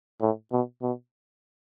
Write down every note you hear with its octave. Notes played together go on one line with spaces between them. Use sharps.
A2
B2
B2